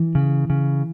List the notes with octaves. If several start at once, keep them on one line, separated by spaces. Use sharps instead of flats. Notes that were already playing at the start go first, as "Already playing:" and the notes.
Already playing: E3
C#3
C#3